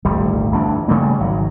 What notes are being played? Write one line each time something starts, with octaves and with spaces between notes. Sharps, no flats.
D#1 G#1 D2 G3
G1 D2 E3 D4
C#3 G3 A3 A#3
G#1 F#3